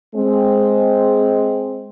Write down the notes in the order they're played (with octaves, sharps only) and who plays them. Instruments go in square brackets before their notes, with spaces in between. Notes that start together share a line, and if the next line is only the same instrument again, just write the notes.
[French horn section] G#3 C4